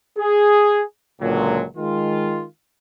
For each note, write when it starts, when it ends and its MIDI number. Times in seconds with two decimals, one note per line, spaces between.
0.18 0.82 68
1.21 1.65 37
1.21 1.65 46
1.21 1.65 50
1.21 1.65 54
1.77 2.45 51
1.77 2.45 56
1.77 2.45 65